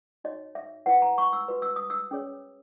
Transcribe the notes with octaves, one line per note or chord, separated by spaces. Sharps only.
D#4 F#4 C#5 D#5
E5
E4 B4 F#5
A#5
C#6
E6
F#4 B4
E6
D#6
E6
C#4 G#4 C#5